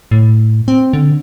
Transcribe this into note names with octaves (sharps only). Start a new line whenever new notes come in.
A2
C4
D3